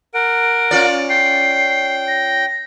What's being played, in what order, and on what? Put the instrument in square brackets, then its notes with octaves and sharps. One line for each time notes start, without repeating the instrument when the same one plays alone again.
[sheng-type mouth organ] A#4 F#5 [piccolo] D7
[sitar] C#4 F4 D5
[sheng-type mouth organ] G5 [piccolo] C7
[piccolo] A#6